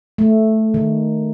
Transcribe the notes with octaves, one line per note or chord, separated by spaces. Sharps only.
A3
D#3